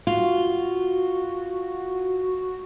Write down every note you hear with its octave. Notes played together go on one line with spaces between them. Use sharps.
F4 F#4